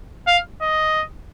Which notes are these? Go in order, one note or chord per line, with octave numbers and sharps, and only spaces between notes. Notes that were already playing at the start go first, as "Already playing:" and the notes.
F5
D#5